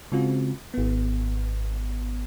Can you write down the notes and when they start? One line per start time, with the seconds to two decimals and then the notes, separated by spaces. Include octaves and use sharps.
0.12 C#3 G#3 C4 F4 F#4
0.74 G#1 B3